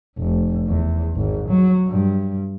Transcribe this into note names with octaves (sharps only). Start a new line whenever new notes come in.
F1
E2
G#1
F#3
G2